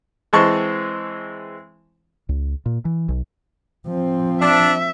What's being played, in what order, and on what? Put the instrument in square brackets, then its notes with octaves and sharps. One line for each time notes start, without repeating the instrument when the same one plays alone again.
[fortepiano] E3 G#3 C4 A5 C#6
[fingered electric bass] C#2
A#2
E3
B1
[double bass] F3 C4
[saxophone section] D4 [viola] E5